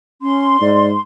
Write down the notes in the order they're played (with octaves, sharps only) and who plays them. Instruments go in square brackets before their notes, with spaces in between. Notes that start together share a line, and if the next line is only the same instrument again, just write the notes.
[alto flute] C#4 [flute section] C6
[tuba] G#2 [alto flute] D5